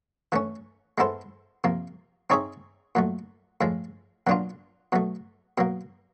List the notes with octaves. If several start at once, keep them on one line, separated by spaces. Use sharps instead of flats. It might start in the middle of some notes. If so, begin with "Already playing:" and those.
E3 A3 C#4
G#3 B3 E4 A4 C5
C3 F3 A#3
C4 D#4 G#4 C#5 E5
A#2 F#3 A3
A2 F3 G#3
B2 F#3 A#3 D4 F4
B2 F#3 A3
B2 F#3 A#3